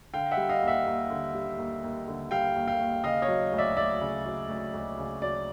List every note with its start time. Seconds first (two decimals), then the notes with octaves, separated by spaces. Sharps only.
0.14 D3 F5 G5
0.31 E5 F#5
0.37 G3
0.49 D#5 F5
0.62 D#2
0.68 E5 F#5
0.86 D#2
1.10 D3
1.35 G3
1.58 D#2
1.83 D#2
2.08 D3
2.31 G3 F5 G5
2.56 D#2
2.68 F5 G5
2.80 D#2
3.04 C#3 D#5 F5
3.22 C#5 D#5
3.28 F#3
3.52 D2
3.58 D5 E5
3.77 D2 D5 E5
4.01 C#3
4.26 F#3
4.49 D2
4.74 D2
4.98 C#3
5.22 F#3 D5